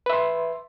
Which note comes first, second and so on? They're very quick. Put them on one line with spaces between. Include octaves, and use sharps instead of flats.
B4 E5 C6